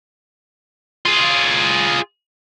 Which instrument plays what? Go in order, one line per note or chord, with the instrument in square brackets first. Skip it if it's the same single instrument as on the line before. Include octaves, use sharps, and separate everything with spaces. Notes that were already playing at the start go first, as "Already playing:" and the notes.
[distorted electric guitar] F4 G#4